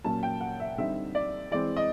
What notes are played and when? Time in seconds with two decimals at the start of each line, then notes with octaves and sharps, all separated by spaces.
0.04 A#2 F#3 A#3 C#4 A5
0.23 G5
0.41 F#5
0.60 E5
0.78 D3 G3 C4 D#4 E5
1.15 D5
1.51 E3 G#3 C4 D5
1.77 D#5